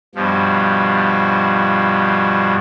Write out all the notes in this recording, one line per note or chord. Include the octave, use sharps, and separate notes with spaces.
G2 B2 F3